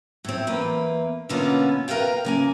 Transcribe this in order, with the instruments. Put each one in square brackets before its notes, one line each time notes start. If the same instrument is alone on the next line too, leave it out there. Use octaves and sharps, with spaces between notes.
[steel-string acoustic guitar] A2 C4
E2 A#3 B4
B2 D3 A#3 B3 C#4 F4
A#4 B4 C#5 F5 G5
C#3 A#3 G#5